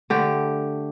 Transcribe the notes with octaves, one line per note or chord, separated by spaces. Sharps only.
D3 A3 G4